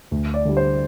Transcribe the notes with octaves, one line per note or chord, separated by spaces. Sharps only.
D2
D5
D3 G3
C5